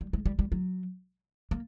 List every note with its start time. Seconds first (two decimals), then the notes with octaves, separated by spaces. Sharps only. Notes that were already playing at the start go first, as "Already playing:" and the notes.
0.01 G3
0.13 G#3
0.26 G3
0.39 G3
0.52 F#3
1.51 A#3